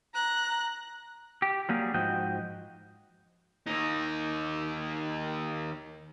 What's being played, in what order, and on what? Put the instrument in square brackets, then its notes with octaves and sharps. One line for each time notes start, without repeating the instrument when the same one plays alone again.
[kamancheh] A#5 F#6
[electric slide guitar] G4
F#3 G3 A#3 G#4
G#2 F3 F#4 D#5 G5
[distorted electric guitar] D#2 D#4